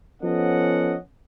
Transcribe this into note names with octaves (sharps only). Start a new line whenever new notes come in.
F3 B3 C#4 A4 D#5 F#5